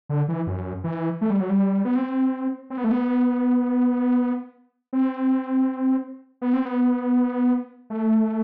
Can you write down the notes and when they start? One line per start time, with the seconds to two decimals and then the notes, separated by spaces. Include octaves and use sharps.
0.09 D3
0.28 E3
0.47 F#2
0.84 E3
1.21 A3
1.30 G3
1.40 F#3
1.50 G3
1.85 B3
1.96 C4
2.70 C4
2.77 B3
2.84 A3
2.91 B3
4.93 C4
6.42 B3
6.53 C4
6.65 B3
7.90 A3